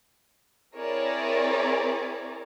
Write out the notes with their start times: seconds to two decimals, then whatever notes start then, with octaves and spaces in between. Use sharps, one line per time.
0.77 C4 E4 G#4 A#4 C#5 D5